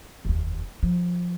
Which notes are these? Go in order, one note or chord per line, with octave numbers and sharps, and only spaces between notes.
F1 D#2
F3